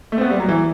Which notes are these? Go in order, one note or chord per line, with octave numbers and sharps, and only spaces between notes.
A3
C4
B3
G3
F#3
E3